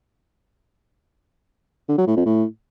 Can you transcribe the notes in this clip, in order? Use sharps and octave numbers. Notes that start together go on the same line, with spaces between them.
D3
F#3
A2
F2
A2